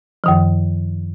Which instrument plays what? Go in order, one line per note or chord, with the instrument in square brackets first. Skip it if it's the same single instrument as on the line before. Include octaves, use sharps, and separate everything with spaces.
[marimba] F#2 D#3 F3